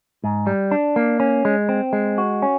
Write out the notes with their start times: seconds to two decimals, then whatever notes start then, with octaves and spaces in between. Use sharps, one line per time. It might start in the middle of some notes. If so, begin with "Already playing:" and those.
0.24 G#2
0.47 G3
0.71 D4
0.96 A#3
1.20 C#4
1.45 G#3
1.69 C4
1.93 G#3
2.18 F#4
2.42 C#4